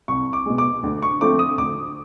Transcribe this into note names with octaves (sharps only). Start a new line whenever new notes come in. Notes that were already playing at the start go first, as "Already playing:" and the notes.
C2 C#6
D6
B2 G#3
D6
D2
C#6
D3 F3 A3 C4 D6
D#6
D2 D6